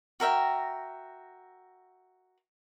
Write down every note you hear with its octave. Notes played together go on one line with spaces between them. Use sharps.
F#4 A#4 E5 G5